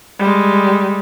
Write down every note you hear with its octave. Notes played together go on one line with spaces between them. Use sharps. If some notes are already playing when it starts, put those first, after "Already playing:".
G3 G#3